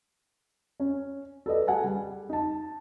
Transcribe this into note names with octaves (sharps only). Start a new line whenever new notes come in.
C#4
A4 B4 D5 D#5
G#4 A4 F#5 G#5 A5
G3
D#4 A5